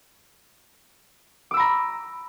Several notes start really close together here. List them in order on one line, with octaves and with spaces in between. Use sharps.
D6 E6 B5 A#5